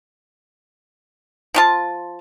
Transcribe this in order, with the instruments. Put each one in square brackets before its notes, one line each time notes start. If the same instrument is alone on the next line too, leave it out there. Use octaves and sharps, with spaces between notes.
[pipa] F3 F4 A5